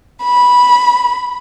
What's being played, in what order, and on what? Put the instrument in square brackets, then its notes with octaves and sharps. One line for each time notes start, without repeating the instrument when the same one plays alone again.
[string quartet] B5